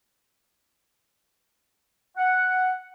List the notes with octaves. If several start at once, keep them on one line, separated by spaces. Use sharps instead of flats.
F#5